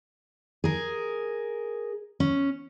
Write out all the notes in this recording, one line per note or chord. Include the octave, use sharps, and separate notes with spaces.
G#4 A#4
C#4